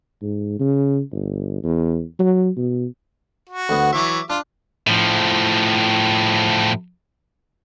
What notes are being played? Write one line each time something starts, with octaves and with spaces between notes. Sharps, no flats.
G#2
C#3
G1
E2
F#3
B2
F#4
D2 B3
E3 F#3 E5 C#6 D6
D4 F4
A2 F3